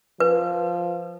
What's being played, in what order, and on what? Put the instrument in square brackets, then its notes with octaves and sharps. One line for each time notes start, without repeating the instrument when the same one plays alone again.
[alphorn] F3 [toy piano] B4